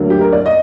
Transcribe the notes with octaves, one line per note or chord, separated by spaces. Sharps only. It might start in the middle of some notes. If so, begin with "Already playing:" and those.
Already playing: D2 D3 F#3 A#3
G4
A#4
D5
D#5